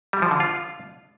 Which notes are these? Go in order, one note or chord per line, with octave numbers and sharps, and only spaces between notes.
G3
F3
D3
F4